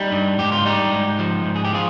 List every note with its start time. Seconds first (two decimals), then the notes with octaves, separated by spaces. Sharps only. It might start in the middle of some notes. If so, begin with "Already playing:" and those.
Already playing: G3 D#4 G4
0.12 G2
0.39 G#2 G4
0.52 F4
0.65 G3 D#4 G4
0.93 G#2
1.19 F3
1.45 G#2
1.56 G#4
1.65 G4
1.72 F3 F4 G#4